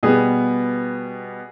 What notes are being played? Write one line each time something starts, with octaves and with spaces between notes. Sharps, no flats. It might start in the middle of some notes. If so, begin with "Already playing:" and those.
B2 G3 B3 G#4